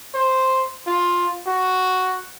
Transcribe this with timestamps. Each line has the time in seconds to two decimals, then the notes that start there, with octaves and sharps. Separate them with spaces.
0.15 C5
0.87 F4
1.47 F#4